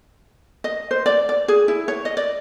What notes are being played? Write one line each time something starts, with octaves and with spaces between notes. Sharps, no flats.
D#5
C5
D5
D5
G#4
E4
C#5
D#5
D5